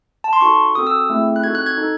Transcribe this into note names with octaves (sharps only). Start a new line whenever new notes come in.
A5
C6
D#4 F#4 A4 C#6
C4 F#4 A4 D#6
E6
A3 C4 E4 G#4
F#6
C4 D#4 F#4 A4 G#6
F#6
G#6
D#4 A4